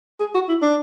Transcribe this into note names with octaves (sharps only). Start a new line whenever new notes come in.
G#4
F#4
E4
D4